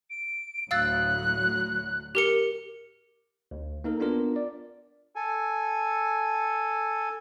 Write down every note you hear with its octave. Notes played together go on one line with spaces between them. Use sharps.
D7
D2 A2 F#3 F5 E6 F#6 A6
G4 A#4 C#7
D2
A#3 D#4 A4 A#4
B3 D4 F4 A#4
D5
A4 G#5